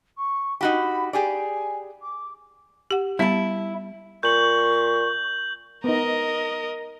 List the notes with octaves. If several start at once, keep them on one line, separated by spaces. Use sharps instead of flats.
C#6
D#4 F#4 G4 B5
G4 G#4 D5 G#5
D6
G4 F#5
G3 B3 E4 A5
A#2 C#6 G6 F#7
B3 D#4 A#4 D#5